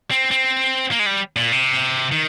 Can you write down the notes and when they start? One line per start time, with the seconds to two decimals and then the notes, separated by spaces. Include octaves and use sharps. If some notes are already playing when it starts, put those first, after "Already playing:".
0.11 C4
0.31 C4
0.91 A#3
0.99 G#3
1.06 G3
1.36 A#2
1.52 C3
2.12 D#3